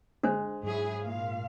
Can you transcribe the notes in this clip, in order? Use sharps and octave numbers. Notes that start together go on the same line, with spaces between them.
G#3 D4 C5
G#2 F#3 E4 G#4
A#2 F5